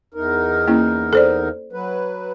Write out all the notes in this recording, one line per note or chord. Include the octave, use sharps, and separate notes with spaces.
E2 D#4 A#4
A#3 C#4 E4
A4 C5 D5
F#3 B4